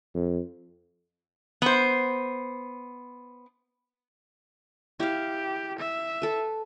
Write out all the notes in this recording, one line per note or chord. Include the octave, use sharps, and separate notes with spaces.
F2
B3 C5
E4 G4 F5
E5
A4 B4